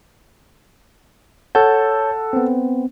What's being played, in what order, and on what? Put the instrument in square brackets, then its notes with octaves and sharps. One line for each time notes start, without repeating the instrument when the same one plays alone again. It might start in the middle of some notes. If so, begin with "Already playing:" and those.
[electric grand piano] A4 F#5 [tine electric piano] C#5 A5 G6
[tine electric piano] B3 C4